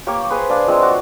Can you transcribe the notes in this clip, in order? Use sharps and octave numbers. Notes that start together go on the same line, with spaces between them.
A#3 G4 C#5
G#4 B4 C5
D4 F5
F3 G#3 C4
F#4 C#5 D6